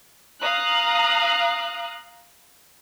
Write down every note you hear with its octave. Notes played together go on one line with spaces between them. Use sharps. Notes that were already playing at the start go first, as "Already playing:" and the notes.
F5 A#5 D#6 F#6